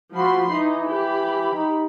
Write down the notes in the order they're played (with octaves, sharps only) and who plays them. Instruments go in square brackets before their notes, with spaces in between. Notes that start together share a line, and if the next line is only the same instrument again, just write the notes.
[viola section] F3 B5 C6 [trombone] F#4
[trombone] E3 [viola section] D#4
[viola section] G4 B5
[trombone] D#4